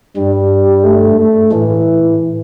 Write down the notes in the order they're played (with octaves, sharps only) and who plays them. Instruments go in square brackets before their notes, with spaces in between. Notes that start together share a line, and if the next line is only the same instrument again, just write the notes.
[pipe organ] G2 [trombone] G3
[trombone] A3
A3
[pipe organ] A2 [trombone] E3